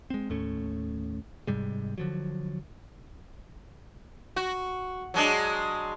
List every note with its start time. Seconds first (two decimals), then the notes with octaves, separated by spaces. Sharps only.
0.10 G#3 C4
0.29 D#2 A2 A3 C#4
1.47 G#2 C3 G3 G#3
1.98 D3 F3 F#3
4.36 F#4
5.14 F#3 G#3 D4